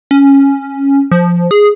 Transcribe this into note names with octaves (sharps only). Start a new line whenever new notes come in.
C#4
F3
G#4